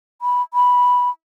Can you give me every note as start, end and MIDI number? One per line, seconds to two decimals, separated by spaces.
0.22 0.42 83
0.54 1.09 83